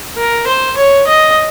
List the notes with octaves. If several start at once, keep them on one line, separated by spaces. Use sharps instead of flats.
A#4
C5
C#5
D#5